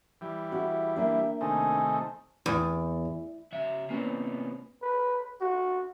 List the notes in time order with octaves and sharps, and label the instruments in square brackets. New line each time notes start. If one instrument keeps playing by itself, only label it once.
[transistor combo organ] E3 G3
[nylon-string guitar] E4 F#4 G#4
[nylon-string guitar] A#3 D4 [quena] E5
[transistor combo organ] C3 D#3 A3 [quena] G#5
[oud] E2
[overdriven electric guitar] C#3 E5
[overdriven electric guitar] C3 A#3 [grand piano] B3 C#4
[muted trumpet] B4
F#4